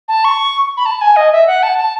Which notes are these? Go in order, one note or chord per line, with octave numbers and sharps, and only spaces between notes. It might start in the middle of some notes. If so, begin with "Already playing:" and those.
A5
C#6
B5
A5
G#5
D#5
E5
F#5
A5
A5